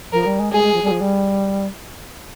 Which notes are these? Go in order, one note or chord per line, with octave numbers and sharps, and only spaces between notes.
F3 A#4
G3
G#3
G#3 G#4
G#3
F3
G3
F3
G3